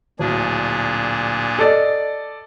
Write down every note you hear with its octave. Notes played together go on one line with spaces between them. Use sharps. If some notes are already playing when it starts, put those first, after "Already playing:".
D1 A#2 D4 G#4
A4 D5 D#5